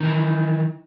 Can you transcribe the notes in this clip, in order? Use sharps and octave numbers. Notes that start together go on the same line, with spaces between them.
D#3 E3